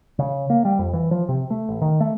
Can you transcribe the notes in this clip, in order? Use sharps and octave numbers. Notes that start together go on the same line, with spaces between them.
C#3
A#3
G3
F2
E3
F3
C3
A3
A1
D#3
A3